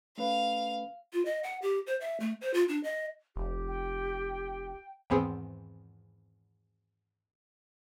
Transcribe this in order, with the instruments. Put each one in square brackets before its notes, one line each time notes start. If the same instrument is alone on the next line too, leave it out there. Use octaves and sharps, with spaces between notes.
[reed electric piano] A3 C#4 B4 [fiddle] F5
[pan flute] F4
D#5
F#5
G4
C5
E5
A3
C5
F4
D4
D#5
[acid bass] F1 [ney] G4
[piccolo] G5
[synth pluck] G#1 E2 B3 C4 G#4